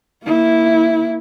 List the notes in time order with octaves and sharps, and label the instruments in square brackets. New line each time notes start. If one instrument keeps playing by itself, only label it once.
[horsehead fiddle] A#3 E4